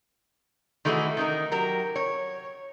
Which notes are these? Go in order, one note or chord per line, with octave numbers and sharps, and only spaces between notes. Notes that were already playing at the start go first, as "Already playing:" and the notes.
D#3 E3 A3 E4 F#4 G#4
D#3 D#4 A#4
F#3 G4 A#4
C#5